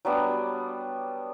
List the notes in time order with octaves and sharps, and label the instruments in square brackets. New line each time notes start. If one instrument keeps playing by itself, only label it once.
[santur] F#3 G3 B3 D4